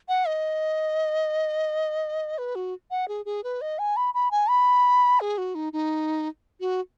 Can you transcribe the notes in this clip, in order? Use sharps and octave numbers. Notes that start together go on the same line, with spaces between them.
F#5
D#5
B4
F#4
F#5
G#4
G#4
B4
D#5
G#5
B5
B5
G#5
B5
G#4
F#4
D#4
D#4
F#4